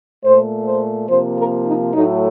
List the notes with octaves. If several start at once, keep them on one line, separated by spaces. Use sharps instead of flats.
A#2 A3 C5
C5
C3 F3 A#3 C5
A#4
D#4
A2 F#3 A3 D#4